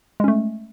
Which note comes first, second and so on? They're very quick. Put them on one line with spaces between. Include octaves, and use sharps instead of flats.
G#3 C#4 A3